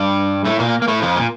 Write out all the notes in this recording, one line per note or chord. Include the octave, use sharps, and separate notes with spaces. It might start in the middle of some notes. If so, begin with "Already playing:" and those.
Already playing: G2 G3
A2 A3
A#2 A#3
A#3
A2 A3
F2 F3
A#2